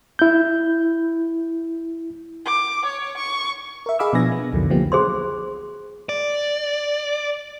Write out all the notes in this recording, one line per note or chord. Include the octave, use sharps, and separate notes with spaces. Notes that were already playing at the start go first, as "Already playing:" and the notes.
E4 G6
D6
C#5
C#6
A#4 E5
G#4 D#5 F5 B5 D6 E6
B2 F3 B3 D4 G#5 A#6
B3
C2 F2 D3 D#3 F#3
D3 F3 F#3 A#3 B3 G4
G#4 C5 C6
D5